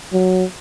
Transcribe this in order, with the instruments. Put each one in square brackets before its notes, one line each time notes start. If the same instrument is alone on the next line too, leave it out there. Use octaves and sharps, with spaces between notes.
[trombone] F#3